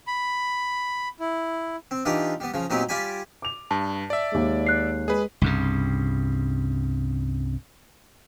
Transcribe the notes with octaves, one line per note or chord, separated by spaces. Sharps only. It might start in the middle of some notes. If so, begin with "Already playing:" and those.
B5
E4
C4
E3 D4 D#4 F4 G4
G3 B3
C#3 F3
A#2 F#3 B3 C4 D#4 G4
G3 F4 G4 D5 G#5 B5
D6 F7
G2 A5
D5 E5
D#2 G#3
F#6 C7
G#3 G#4 B4
C2 G2 C#3